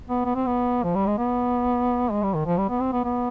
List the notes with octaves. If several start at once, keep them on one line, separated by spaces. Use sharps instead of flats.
B3
B3
C4
B3
F3
G3
G#3
B3
G#3
G3
D#3
F3
G3
B3
C4
B3
B3